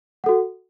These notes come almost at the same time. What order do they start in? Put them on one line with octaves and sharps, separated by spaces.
F#5 A4 F#4